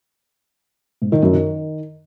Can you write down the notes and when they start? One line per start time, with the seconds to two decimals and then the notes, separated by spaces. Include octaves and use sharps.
1.02 G#2
1.12 D#3
1.23 F#2
1.33 D#3